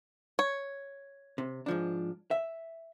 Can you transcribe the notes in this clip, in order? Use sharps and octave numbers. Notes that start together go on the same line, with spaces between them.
C#5
C3
G#2 F3 D4
E5